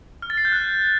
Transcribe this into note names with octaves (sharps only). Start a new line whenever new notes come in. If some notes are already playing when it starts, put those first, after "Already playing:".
F6
A6
C7
G6
F#6